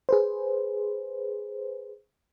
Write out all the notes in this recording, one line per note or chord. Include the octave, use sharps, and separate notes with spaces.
G#4 B4 C5